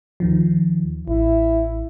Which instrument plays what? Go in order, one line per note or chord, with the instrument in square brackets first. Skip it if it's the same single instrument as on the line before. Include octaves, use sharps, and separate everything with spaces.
[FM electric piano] D#2 D#3 F3
[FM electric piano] A1 [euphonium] E4